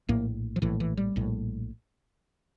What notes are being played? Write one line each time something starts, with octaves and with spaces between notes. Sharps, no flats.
A#1 A2 A#3
F3
A#1 A2 E3
E3
G3
A#1 A2